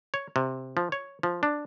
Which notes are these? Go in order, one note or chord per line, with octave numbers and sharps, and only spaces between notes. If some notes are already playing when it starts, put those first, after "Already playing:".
C#5
C3
F3
C#5
F3
D4